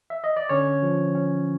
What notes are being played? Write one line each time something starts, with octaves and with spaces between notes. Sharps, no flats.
E5
D#5
D5
D3 C#4 C#5
F3
C#4